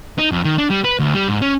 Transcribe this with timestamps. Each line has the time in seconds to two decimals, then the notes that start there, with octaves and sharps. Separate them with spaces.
0.19 D#4
0.31 F2
0.45 D#3
0.58 D4
0.70 G3
0.84 B4
0.99 D2
1.14 G3
1.28 G#2
1.42 C#4